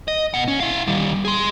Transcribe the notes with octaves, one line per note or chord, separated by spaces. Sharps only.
D#5
B2 F#5
C#4
E4 F5
D#3 G3
G#4 C6